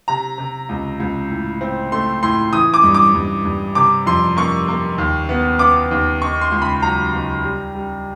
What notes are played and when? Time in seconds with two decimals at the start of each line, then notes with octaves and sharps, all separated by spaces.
0.08 C3 A#5
0.38 C3
0.69 C#2
1.00 C#2
1.30 A2
1.61 C4
1.92 A3 C6
2.23 A2 C6
2.53 E3 D#6
2.74 D6
2.83 G2
2.94 D6
3.14 G2
3.45 G2
3.75 C3 D6
4.06 F2 C6
4.36 A#3 C#6
4.68 A#3
4.98 D#2
5.29 B3
5.59 B3 D6
5.91 D#2
6.21 D#3 C#6
6.41 C6
6.52 C#2
6.62 B5
6.82 F#3 A#5
7.13 C#2
7.44 G3
7.75 G3